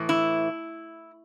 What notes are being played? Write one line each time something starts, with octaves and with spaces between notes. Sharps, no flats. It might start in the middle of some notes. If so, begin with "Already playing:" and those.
Already playing: A2 E3
E4